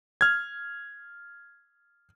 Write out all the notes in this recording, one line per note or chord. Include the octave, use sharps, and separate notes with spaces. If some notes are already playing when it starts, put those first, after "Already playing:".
F6 G#6